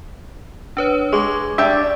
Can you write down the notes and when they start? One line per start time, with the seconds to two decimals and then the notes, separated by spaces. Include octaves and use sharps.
0.77 D4 B4 C#5
1.12 G#3 C#6 D6 G#6
1.58 G3 D4 E5 G5